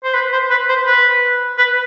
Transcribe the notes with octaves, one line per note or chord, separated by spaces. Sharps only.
C5
B4
C5
B4
C5
B4
B4